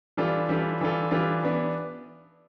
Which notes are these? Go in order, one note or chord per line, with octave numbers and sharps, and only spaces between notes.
E3 G3 D4 F4 A4
E3 G3 D4 F4 A4
E3 G3 D4 F4 A4
E3 G3 D4 F4 A4
E3 B3 D4